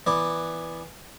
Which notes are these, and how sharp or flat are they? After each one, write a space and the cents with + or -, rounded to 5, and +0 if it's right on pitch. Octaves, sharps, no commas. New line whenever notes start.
E3 +0 B3 +0 D5 +0